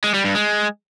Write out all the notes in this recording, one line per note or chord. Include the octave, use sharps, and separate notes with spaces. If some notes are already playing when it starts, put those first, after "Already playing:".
G#3
G3
G2
G#3